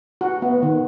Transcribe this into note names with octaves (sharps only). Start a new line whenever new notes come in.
F#4
B3
D#3